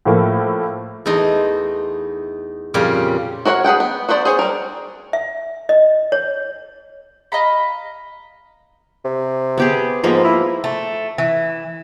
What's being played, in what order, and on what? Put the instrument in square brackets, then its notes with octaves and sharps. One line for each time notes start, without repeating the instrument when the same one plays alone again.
[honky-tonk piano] A2 F3 A3 A#3
[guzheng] E2 A3 D#4 C6
F2 A#2 C#3 G3 C#4 G4
[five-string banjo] F#4 A#4 C#5 E5 F#5
G#4 B4 F#5 G5
B3
F#4 B4 C5 D5
G#4 C5 C#5 G#5
G3 A#4
[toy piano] E5
D#5
C#5
[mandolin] D#5 F5 A#5 B5
[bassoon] C3
[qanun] B3 G4 G#4
[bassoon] G#2 [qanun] F3 A#3 B3
[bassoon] E4
[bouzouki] A3
E3